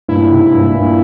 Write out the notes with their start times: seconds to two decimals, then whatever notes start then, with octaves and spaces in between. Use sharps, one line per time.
0.08 G2 A#2 E4
0.30 G#2 C3
0.52 G2 A#2
0.74 G2 A#2